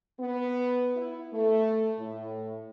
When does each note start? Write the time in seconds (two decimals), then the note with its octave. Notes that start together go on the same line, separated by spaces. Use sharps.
0.20 B3
0.96 E4
1.33 A3
1.98 A2